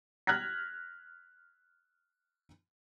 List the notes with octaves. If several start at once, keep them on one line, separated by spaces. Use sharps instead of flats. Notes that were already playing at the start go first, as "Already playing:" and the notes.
F6 F#6 G#6 A#6 B6